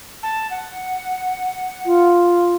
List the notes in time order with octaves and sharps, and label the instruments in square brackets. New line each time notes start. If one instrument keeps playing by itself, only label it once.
[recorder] A5
F#5
[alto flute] F4